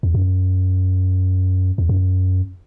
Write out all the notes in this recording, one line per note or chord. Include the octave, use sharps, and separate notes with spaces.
E2
F#2
E2
F#2